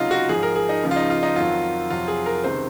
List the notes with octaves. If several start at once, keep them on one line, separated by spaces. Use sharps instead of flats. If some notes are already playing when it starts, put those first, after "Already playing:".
Already playing: C#2 C3 F#3 D#4 F4
F#4
G#2 F3 G#4
A#4
G#4
D#4
C#2 C#3 F3
F4
D#4
F4
D#4
F2 D#3 F#3 F4
F2 C3 F#3 F4
G#4
A#4
C#2 C3 D#3 C5